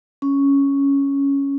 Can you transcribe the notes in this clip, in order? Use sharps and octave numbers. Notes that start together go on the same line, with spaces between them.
C#4